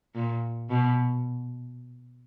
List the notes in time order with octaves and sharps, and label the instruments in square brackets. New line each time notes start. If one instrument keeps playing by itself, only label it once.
[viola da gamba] A#2
B2